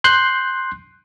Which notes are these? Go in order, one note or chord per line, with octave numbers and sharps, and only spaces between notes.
C6 F#6 G6 C7